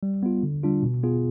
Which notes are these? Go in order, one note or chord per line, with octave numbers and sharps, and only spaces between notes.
G3
B3 F4
D3
G3 D4 F4
B2
B3 F4 G#4